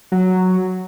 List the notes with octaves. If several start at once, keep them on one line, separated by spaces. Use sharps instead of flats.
F#3